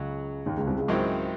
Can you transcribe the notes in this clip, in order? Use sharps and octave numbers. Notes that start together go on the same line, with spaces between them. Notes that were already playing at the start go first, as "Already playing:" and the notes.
Already playing: C#2 C#3 F#3 F#4
D#2 D#3
C#2 C#3
C2 C3
C#2 C#3
G#2 D#3 F#3 C4 E4